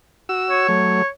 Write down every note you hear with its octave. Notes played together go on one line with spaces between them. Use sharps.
F#4 E6
C#5
F#3 A3